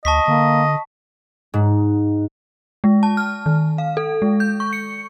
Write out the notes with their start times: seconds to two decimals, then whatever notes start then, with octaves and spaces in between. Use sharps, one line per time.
0.05 D2 D#5 A5 C#6 B6
0.28 D3 A#3
1.54 G#2
2.84 G#3
3.03 A5
3.17 F6
3.46 D#3
3.78 F5
3.97 A4
4.22 G#3
4.40 G6
4.60 C#6
4.73 C#7